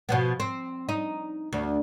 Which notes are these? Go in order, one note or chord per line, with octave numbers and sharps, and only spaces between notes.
B2 F3 B3
C4
D#4
D2